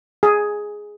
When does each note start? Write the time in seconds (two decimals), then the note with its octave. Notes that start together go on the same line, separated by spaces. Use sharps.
0.23 G#4